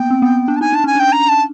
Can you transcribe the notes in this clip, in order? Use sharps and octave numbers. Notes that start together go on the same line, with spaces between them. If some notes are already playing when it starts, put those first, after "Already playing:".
Already playing: A#3 B3 G5
C4
B3
D4
A5
D#4 G#5
D4 A5
C#4 G#5
D4 G5
A#5
A5